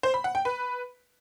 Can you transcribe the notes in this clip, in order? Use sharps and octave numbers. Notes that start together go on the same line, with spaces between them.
C5
B5
F#5
G5
B4